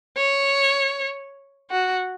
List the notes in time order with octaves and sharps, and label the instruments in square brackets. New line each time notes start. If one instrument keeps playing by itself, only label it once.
[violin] C#5
F#4